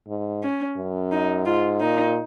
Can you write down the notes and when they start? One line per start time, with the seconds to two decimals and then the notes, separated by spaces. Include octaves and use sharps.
0.08 G#2
0.43 C#4
0.77 F#2
1.12 D#4
1.46 G#2 F4
1.80 A#2 D#4